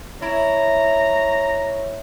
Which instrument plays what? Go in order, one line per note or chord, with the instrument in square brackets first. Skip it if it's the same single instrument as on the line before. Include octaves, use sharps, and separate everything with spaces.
[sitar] E4 [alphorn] C#5 [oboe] A#5